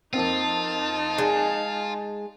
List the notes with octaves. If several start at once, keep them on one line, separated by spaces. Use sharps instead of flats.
F2 A#3 C4 D#4 F4 A5
G#3